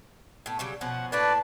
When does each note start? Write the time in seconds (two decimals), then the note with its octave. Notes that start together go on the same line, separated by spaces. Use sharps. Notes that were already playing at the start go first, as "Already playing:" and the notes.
0.46 A2 B3
0.59 C#3 F#3 G3
0.81 B2 F3 C#4 F#5
1.12 A2 A#3 D4 B4 D5